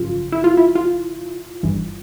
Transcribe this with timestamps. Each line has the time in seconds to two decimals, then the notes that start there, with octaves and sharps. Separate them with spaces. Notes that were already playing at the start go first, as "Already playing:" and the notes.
Already playing: G#1 F#2 C#3 F3 F4
0.32 E4
0.44 F4
0.57 E4
0.75 F4
1.63 G1 G2 E3